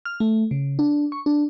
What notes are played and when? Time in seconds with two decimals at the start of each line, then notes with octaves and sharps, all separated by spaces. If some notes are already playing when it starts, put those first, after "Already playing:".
0.05 F6
0.20 A3
0.51 C#3
0.79 D4
1.12 C#6
1.26 D4